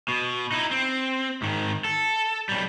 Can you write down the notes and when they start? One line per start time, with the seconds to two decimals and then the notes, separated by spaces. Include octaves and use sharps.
0.08 B2
0.52 D#4 E4
0.71 C4
1.42 G#2 D#3
1.85 A4
2.49 B1 G3